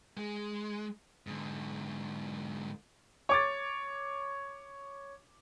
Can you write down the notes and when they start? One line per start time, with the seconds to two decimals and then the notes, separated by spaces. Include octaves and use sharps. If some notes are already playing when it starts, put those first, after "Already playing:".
0.17 G#3
1.27 G#2 D3
3.29 C#5 D6 A6